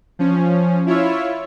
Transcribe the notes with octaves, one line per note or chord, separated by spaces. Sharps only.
F3 C#4
E4 F4 C#5 E5